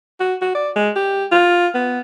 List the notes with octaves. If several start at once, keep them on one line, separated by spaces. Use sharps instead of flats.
F#4
F#4
D5
G#3
G4
F4
B3